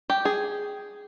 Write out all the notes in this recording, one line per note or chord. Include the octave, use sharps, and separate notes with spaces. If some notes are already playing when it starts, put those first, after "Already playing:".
G4
G#4